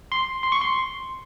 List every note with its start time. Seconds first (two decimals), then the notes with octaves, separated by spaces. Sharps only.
0.12 C6
0.43 C6
0.52 C#6
0.61 C6